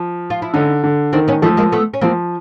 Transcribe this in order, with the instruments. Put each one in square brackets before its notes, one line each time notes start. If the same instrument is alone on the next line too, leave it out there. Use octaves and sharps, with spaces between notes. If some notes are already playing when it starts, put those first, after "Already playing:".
Already playing: [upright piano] F3
[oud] F4
E4
[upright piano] D3 [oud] C#4 D#4
[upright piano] D3
[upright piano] D#3 [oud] C4 D4
[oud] B3 C#4
[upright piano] F3 [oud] A3 B3
[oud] G#3 A#3
A3 B3
C#4
[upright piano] F3 [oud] A#3 C4